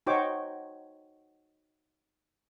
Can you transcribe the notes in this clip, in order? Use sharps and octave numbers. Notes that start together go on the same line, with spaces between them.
D#4 F#4 C5 C#5 G5 D6